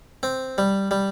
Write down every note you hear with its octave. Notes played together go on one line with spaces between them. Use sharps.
C4
G3
G3